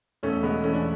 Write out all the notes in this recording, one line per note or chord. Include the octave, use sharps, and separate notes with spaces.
E1 A3 C#4
B2 G#3 B3
E2 A3 C#4
D4